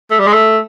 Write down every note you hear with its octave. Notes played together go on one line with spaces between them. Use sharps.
A3
G3
G#3
A3